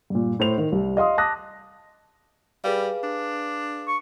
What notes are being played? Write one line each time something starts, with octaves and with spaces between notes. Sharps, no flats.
G2 A#2
A2 C5 F7
D#3
C2
D#5 F5 C6 D#6
A5 D6 D#6 F#6 A#6
G3 G#4 B4 F5
D4
C#6